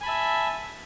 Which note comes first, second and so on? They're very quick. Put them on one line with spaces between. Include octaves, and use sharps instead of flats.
G#5 B5 A5 E5